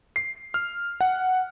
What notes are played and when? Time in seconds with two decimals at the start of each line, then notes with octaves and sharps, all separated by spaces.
0.16 C7
0.54 F6
1.01 F#5